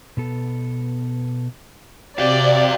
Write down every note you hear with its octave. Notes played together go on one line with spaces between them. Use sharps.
B2 B3 A4
C3 F#4 D5 F5 G5